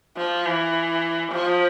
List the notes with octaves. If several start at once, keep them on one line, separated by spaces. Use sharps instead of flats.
F3
E3
F3